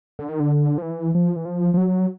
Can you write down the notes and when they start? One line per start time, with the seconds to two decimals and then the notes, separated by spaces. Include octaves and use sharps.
0.19 D3
0.29 D#3
0.40 D3
0.78 F3
0.82 E3
1.15 F3
1.36 E3
1.45 F3
1.74 F3
1.77 F#3